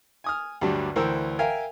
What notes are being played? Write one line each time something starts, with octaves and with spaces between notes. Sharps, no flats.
G#5 D#6 F6
D2 G2 F#3 G3 D4
D2 E3 A#4 C5 G5 E6
A#4 E5 F5 G5 G#5